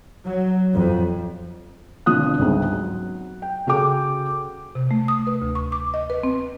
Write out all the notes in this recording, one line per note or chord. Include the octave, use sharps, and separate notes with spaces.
F#3
F2
G#1 B2 D3 F3 D#6 F#6
G1 C#2 G#2 C4 D#4 G#4
F#3
G5
C#3 F#4 G#4 A4 G5 D6
C3
A3
D#6
B4
D2
C#6
D6
D#5
B4
C4